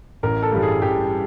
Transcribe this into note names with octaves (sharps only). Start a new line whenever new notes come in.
A1 A#4
A4
G2 E3 G3
G#4
A1 G4